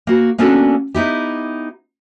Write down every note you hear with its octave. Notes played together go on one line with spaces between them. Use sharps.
A#3 F#4
A#3 B3 C#4 D4 F#4 A4
B3 D#4 E4 G4